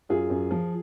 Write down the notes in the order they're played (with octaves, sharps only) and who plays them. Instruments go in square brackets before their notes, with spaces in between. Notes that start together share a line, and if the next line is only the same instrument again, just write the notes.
[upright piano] F#2 F4 G#4
F#2
F3